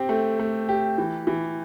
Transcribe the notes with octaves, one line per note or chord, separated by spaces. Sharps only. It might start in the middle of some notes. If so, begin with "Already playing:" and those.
Already playing: C4 G4
A3
A3
G4
E3
E3